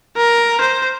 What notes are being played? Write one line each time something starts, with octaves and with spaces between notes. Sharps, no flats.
A#4
C5